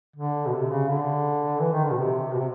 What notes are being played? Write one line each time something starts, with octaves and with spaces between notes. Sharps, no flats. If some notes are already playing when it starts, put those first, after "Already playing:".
D3
B2
C3
C#3
D3
E3
D#3
D3
B2
C3
B2
C3